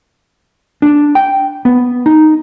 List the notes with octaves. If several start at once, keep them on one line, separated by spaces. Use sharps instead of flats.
D4
G5
B3
D#4